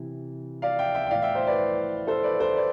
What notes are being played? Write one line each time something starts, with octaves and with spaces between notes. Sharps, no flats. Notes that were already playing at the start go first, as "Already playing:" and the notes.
Already playing: C3 E3
D5 F5
E5 G5
E5 G5
G5
A2 E3 D5 F5
E5 G5
C5 E5
B4 D5
A4 C5
B4 D5
A4 C5
B4 D5